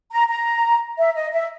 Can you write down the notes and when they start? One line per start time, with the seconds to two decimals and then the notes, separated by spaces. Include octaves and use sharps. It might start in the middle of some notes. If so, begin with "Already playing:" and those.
0.11 A#5
0.29 A#5
0.98 E5
1.15 D#5
1.33 E5